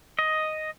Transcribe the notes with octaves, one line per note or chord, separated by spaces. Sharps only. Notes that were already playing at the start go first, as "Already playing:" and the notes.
D#5